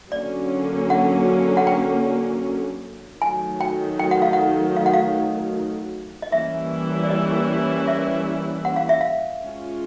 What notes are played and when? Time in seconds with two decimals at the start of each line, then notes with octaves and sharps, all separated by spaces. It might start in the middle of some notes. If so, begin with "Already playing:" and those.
0.12 D3 F#3 A#3 C#4 D5
0.90 F#5
1.57 F#5
1.67 G5
3.22 D#3 F#3 A3 G#5
3.61 G5
3.99 G5
4.11 F#5
4.22 F5
4.33 F#5
4.76 F5
4.86 F#5
4.93 F5
6.22 D#5
6.32 E3 G3 A#3 C#4 E4 E5
7.03 D5
7.10 D#5
7.88 E5
8.65 F#5
8.76 F5
8.89 E5
9.01 F5
9.42 G#3 C#4 F4